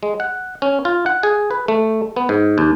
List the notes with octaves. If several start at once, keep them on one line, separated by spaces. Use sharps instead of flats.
G#3
F#5
C#4
F4
F#5
G#4
B4
A3
B3
G#2
D#2